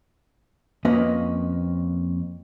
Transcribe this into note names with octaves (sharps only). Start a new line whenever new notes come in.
F2 A#3 C#4 B4 D#5